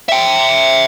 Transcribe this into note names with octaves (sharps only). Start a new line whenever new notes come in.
E5 G5